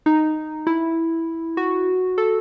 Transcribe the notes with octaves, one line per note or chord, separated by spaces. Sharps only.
D#4
E4
F#4
A4